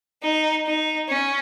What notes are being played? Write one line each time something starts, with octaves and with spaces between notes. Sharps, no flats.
D#4
D#4
C#4